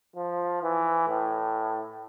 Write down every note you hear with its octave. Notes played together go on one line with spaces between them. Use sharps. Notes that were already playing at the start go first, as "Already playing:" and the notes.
F3
E3
A2